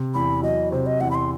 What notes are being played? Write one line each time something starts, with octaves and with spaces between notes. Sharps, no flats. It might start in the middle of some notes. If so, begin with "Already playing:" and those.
Already playing: C3
E2 B5
F#3 D#5
C3 C5
D#5
E2 F#5
B5
C6